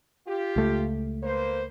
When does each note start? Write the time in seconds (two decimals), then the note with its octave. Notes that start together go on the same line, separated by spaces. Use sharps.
0.26 F4 G4
0.56 C#2 A3
1.22 A#3 B4 C5